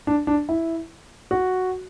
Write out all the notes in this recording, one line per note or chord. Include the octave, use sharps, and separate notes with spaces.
D4
D4
E4
F#4